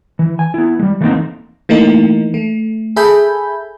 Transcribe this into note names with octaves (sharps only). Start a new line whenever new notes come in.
E3
G#5
B3 E4
G3 G#3
E3 A3 A#3 C4 D#4
E3 A3 A#3 D#4
A3
G#4 A4 E5 G#5 B5 G6